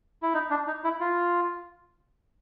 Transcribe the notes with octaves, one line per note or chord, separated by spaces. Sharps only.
E4
D#4
D4
D#4
E4
F4